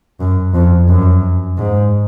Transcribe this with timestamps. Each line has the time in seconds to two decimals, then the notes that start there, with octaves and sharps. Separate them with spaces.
0.20 F#2
0.54 F2
0.89 F#2
1.58 G#2